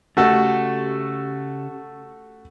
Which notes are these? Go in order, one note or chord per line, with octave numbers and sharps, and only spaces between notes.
C#3 A3 F#4 G4 A4 D#5